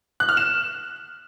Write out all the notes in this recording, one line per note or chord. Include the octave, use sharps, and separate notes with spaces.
F#6
F6
E7